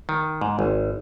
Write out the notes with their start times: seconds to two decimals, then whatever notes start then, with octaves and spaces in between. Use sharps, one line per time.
0.09 D#3
0.41 G#2
0.59 G#1